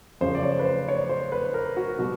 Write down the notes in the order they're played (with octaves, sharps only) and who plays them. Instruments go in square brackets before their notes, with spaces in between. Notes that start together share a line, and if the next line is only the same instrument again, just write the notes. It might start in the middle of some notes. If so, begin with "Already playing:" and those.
[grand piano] F#2 C#3 F3 C5
D5
C#5
B4
C5
C#5
C5
B4
A#4
F#4
B2 G3 F#4